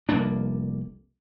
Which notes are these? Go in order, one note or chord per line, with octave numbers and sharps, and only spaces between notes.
F1 C2 A#3 D4